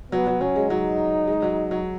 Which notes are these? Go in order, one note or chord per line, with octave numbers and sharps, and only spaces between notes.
F#3 B3
F#3
F#3 C#4
G#3
F#3 D#4
G#3
F#3
F#3